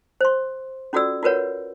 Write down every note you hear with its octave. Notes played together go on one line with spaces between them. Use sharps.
C5 C6
C#4 F4 F#4 A4 D5 E6
F4 F#4 A#4 B4 C#5 F#5